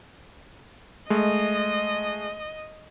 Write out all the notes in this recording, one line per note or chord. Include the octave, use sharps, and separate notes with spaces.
G#3 A3 D#5